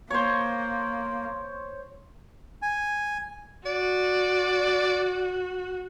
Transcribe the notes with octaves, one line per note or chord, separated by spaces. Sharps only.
A#3 C5 C#5
G#5
F#4 D5